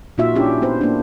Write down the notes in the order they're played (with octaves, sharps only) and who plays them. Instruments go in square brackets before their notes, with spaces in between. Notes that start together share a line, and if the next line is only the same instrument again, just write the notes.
[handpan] A#2 A#3 D#4 F4 F#4 E5
C#4 D4 E4 G4
B3 B4 C5
A#3 D4